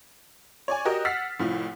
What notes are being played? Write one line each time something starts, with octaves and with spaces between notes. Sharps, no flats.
C#5 D5 G#5
F#4 G4 A#4 D#5
F#5 E6 F6 A6 B6 C7
C2 A2 F3